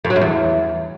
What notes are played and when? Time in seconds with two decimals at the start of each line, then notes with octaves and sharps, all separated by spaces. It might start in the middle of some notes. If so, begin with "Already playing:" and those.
0.05 F2
0.10 F#3
0.16 F#2
0.21 E2